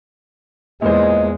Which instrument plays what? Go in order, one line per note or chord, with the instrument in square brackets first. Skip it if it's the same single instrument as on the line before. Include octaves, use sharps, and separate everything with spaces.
[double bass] E2 G#3 [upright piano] A#2 E3 C5 [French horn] D#5